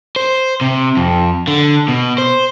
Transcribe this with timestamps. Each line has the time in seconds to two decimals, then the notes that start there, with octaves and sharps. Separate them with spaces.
0.16 C5
0.61 C3
0.97 F2
1.48 D3
1.88 B2
2.18 C5